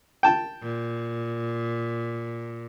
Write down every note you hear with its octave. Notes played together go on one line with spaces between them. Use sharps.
G5 A5
A#2